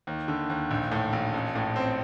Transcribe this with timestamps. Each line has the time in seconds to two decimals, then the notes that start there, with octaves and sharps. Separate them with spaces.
0.07 D#2
0.28 D3
0.50 D#2
0.71 A#1
0.92 A2
1.13 A#1
1.34 A1
1.55 A2
1.76 C4